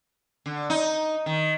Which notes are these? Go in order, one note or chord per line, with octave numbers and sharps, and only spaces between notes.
D3
D#4
D#3